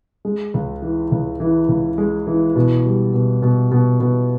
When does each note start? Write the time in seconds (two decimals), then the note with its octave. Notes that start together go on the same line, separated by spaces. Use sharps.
0.25 G#3
0.54 C#2
0.82 E3
1.12 C#2
1.40 E3
1.69 C#2
1.98 G#3
2.27 E3
2.56 B2
2.85 G3
3.14 B2
3.42 B2
3.71 B2
4.00 B2